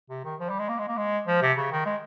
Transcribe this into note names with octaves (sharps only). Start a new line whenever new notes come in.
C3
D#3
F3
G3
G#3
A#3
G#3
A#3
G#3
F3
C3
C#3
D#3
G#3